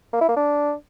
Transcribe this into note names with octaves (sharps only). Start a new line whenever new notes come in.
A#3
E4
A#3
D4